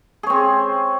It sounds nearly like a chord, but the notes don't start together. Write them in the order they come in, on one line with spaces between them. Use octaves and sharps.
G#4 C#5 C4